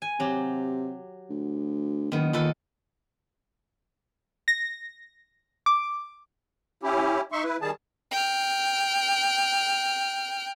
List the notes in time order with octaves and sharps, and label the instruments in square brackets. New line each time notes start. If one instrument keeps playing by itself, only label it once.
[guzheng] G#5
[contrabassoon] C3 [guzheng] F#3 G4
[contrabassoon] D2
[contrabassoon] F#1 [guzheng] D#3 B3
[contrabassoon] A#2 [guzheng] D#3 A4 B4
[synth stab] A#6
D6
[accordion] C#4 E4 G4
D#4 E5 C6 C#6
E4 B4
D#3 G3 G#4 A5
[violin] G5 F6